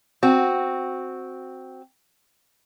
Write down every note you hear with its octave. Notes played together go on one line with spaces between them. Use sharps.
C4 F#4